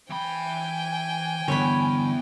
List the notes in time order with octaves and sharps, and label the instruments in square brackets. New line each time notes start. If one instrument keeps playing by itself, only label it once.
[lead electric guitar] E3 B5 [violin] G5 G#5
[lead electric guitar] E2 B3 [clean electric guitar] G2 D3 E3 [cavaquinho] C#5 B5